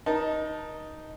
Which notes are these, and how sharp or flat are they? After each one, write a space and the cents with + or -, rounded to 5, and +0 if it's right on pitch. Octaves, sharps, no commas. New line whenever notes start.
D#4 +0 A#4 +35 A5 +0